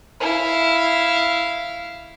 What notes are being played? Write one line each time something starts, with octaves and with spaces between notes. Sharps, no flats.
E4 F5